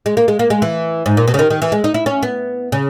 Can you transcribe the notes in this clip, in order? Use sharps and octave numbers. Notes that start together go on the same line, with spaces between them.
G#3
A#3
G#3
A#3
G#3
E3
G#2
A#2
B2
C#3
D#3
D#3
E3
G#3
D#4
E4
C#4
B3
C#3